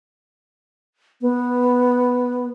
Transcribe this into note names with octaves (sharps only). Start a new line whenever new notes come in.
B3